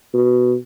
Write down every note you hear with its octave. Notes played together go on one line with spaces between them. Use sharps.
B2